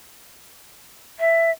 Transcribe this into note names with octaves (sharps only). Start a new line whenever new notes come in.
E5